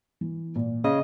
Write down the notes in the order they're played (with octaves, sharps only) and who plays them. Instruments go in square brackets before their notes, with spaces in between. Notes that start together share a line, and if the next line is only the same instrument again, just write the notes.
[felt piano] E3
A#2
[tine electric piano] C#3 [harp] D#5